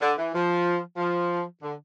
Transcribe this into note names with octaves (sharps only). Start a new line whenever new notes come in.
D3
E3
F3
F3
D3